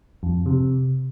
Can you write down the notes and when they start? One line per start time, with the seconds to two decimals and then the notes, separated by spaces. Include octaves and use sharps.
0.23 F2
0.46 C3